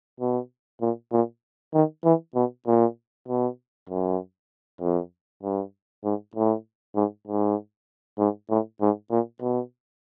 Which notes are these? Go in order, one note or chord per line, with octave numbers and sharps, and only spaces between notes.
B2
A#2
A#2
D#3
E3
B2
A#2
B2
F#2
F2
G2
G#2
A2
G#2
G#2
G#2
A2
G#2
A#2
B2